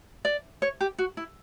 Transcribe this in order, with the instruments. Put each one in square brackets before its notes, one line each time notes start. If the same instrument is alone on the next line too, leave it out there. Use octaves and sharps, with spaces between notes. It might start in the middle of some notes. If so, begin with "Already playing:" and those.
[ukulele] D5
C#5
G4
F#4
E4